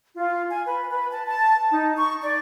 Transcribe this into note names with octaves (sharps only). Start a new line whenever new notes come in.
F4
G#5
B4
B4
A5
A5
D#4
C#6
D5